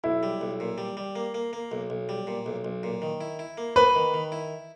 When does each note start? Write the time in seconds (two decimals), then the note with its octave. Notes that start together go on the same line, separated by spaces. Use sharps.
0.04 B1 E4
0.23 G3
0.41 B1
0.60 A#2
0.78 G3
0.97 G3
1.16 A#3
1.34 A#3
1.53 A#3
1.72 B1
1.90 B1
2.09 G3
2.27 A#2
2.46 B1
2.65 B1
2.83 A#2
3.02 D#3
3.21 E4
3.39 E4
3.58 A#3
3.76 A#3 B4
3.95 D#3
4.14 D#3
4.32 E4